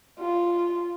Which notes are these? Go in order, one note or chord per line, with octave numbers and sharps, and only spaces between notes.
F4